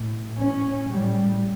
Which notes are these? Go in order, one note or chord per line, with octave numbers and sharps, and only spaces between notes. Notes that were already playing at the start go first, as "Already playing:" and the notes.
Already playing: A2
A2 C#4
A2 G3